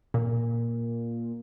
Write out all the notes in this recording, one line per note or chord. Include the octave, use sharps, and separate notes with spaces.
A#2